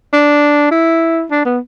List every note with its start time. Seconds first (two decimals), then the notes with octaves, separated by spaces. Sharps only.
0.13 D4
0.71 E4
1.31 D4
1.45 B3